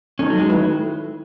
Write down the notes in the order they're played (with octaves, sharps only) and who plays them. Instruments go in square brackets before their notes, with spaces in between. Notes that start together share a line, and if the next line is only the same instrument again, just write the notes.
[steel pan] A3 D#4 A4 [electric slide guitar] C#4
[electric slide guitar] F#3
G#3
[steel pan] D#3 A3 E4 B4 [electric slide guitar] F#3